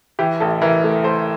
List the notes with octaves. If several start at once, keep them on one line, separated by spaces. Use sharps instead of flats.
E3 G4
A1 A4
E3 A#4
A3
A3 C5